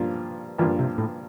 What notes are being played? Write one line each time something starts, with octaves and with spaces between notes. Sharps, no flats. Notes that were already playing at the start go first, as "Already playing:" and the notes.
Already playing: G2 F3 A#3 F4
G2 E3 F3 A#3 F4
C3
A2